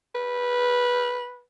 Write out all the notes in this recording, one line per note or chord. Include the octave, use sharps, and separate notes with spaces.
B4